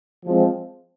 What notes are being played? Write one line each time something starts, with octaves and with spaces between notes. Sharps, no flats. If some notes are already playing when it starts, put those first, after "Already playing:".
F3 G#3 C4